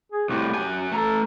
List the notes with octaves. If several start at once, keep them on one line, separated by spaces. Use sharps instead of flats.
G#4
C2 A2 G4
F#2 G#5
A3 A4 A#5